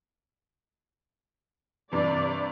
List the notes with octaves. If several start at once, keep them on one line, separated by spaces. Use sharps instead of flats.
G2 C3 E3 D5